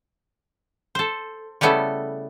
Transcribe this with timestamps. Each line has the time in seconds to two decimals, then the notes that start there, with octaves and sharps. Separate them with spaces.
0.95 A4 C5
1.61 C#3 G3 A3 B3 E4 A4